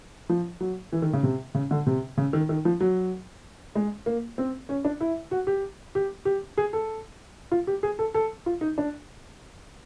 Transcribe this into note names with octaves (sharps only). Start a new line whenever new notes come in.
F3
F#3
E3
D#3
C#3
C3
C#3
D3
C3
C#3
D#3
D#3
F3
F#3
G#3
A#3
C4
C#4
D4
E4
F#4
G4
G4
G4
G#4
A4
F4
G4
G#4
A4
A4
F4
D#4
D4